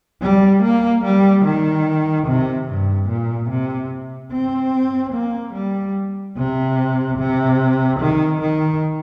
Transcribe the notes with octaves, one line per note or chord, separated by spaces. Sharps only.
G3
A#3
G3
D#3
C3
G2
A#2
C3
C4
A#3
G3
C3
C3
D#3
D#3